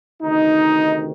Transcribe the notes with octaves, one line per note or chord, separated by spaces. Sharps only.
D2 C3 D#3 D#4